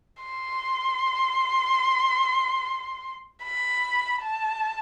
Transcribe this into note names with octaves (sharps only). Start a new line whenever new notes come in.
C6
B5
A5